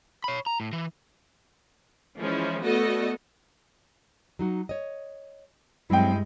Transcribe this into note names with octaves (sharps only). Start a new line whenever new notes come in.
C#5 B5
A#5
A2
E3
E3 F3 G#3 C#4 E4
A3 B3 F#4 A4 D5 D#5
F#3 D#4 F#4
C#5 D#5
G2 F#3 G#3 A3 C4 E4 G5